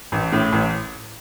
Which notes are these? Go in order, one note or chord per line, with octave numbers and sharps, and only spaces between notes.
A1
A2
A1